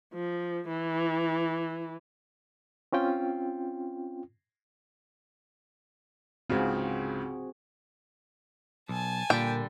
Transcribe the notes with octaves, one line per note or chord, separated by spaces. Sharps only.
F3
E3
C4 C#4 F4 G5
C#2 G#2 C#3 C4 F#4 G#4
B1 G#5 A5
A#2 D3 G3 G5